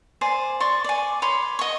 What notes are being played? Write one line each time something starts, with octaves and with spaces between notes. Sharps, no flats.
C5 D5 G#5
D5 C6 C#6
D5 G#5
C#5 B5 C6
D#5 C#6